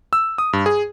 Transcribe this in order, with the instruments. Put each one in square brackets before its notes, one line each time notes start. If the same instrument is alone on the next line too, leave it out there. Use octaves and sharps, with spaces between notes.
[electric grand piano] E6
D#6
G2
G#4